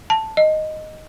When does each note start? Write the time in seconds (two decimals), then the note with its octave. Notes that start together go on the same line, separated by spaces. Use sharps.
0.10 A5
0.37 D#5